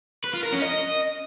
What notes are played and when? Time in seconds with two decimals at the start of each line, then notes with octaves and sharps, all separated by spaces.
0.24 B4
0.33 F4
0.43 A#4
0.52 C#4
0.62 D#5